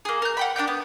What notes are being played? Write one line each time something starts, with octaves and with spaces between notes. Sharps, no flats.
A#3 G#4
A#4 G6
F#5 G5 B5
D4 F#5 G5 G6
B3